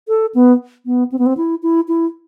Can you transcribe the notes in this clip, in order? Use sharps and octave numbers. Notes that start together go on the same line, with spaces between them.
A4
B3
B3
C4
B3
C4
E4
E4
E4